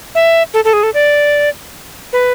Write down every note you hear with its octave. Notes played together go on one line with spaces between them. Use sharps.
E5
A4
A4
G#4
A4
D5
B4